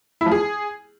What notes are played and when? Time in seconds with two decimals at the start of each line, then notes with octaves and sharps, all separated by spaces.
0.21 E4
0.26 F3
0.31 G#4